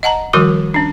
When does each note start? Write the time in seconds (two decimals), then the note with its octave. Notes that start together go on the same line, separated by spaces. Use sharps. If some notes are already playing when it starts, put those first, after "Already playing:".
0.03 D#5 F#5 A5 A#5
0.33 D#3 F3 G3 F#4 A#4 D6
0.74 C#4 D4